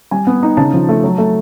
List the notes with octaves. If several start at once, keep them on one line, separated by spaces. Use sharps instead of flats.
G3 G#5
B3
D#4
C#3 A5
F3
A3
F#3
A3